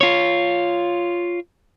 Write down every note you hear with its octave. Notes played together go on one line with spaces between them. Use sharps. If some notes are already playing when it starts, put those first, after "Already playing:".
F4 C#5